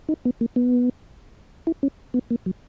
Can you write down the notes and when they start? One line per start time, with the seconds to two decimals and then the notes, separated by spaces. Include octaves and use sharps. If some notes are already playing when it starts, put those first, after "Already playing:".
0.09 D#4
0.25 B3
0.41 A#3
0.56 B3
1.67 E4
1.83 C#4
2.14 B3
2.31 A#3
2.46 F#3